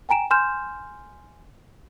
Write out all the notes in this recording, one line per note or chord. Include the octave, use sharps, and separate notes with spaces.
G5 G#5 A#5 D7 E7
G#5 C6 F6 G6 E7